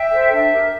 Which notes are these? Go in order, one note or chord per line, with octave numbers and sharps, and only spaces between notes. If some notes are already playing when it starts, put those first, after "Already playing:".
Already playing: E5 G5
A4 C5
D4 E5
G4 A#4